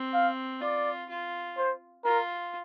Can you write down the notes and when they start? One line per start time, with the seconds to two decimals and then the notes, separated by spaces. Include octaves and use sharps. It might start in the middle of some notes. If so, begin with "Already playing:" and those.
Already playing: C4
0.14 F5
0.62 F4 D5
1.09 F4
1.58 C5
2.05 F4 A#4